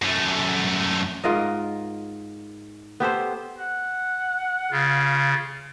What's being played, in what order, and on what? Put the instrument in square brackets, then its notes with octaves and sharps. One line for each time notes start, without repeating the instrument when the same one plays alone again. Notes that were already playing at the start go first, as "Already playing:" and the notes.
[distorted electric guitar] F#2 A3
[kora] G#2 F4 A#4 D#5
B3 G4 A4 C5
[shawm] F#5
[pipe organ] C#3 [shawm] F4